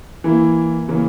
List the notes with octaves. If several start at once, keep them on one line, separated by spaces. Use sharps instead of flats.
E3 A#3 E4
C#3 E3 A#3 C#4